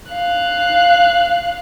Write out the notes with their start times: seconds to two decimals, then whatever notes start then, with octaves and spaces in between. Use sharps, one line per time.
0.11 F5 F#6